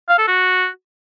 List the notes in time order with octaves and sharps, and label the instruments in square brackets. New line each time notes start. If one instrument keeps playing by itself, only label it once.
[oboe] F5
A4
F#4